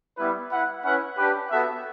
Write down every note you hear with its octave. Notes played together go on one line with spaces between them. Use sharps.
G3 B3 E4 B4
E4 B4 F#5
C#4 E4 B4 F#5
D4 G4 B4
B3 F#4 A4 E5